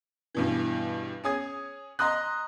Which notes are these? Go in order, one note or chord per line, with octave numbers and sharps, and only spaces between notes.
G2 B2 E3
C#4 G#4 D#6 G#6
D#5 A#5 C6 D#6 F#6